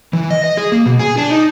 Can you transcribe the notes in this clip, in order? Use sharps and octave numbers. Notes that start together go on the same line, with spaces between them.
E3
D#5
D#5
G#4
A#3
B2
G#4
D4
D#4